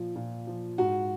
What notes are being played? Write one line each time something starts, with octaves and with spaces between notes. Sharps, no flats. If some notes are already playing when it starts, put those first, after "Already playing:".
Already playing: A#2 F3
A#2
F3
G#2 F#4